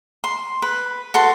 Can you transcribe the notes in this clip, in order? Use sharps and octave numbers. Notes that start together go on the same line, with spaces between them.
C6
B4
F#4 A4 C6